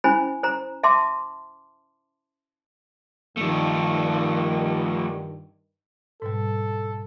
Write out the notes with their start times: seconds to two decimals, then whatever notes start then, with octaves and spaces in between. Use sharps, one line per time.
0.04 C#4 E4 C5 G#5 B5
0.43 C5 A#5
0.83 E5 A5 C6 D6
3.37 G2 D#3 F3 A3
6.22 G#2 B2 G3 A4